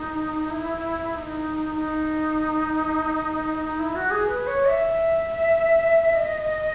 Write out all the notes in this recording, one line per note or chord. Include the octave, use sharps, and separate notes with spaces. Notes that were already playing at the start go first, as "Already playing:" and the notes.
Already playing: D#4
E4
E4
D#4
D#4
D#4
E4
F#4
G#4
B4
C#5
E5
D#5